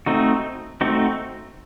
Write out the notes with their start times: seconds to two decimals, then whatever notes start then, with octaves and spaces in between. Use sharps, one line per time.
0.06 A3 C4 D#4 F#4
0.81 A3 C4 D#4 F#4